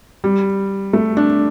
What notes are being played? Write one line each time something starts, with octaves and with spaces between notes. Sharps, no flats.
G3
A3
D4